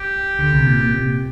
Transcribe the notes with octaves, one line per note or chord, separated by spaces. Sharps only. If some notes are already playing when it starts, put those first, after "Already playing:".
Already playing: G4
D2 D3
C2 C3
A#2
A#2
C3
A#2